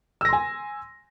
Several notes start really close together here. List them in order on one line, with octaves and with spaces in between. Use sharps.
E6 A#6 C6 G#5